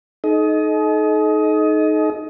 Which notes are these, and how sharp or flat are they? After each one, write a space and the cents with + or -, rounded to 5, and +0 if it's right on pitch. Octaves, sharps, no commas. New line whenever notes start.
D#4 +0 A4 -45 D#5 +15